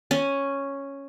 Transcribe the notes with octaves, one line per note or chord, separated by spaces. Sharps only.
C#4